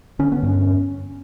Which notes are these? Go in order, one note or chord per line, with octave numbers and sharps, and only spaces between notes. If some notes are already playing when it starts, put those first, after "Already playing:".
D3 C#4
B3
G2 C#4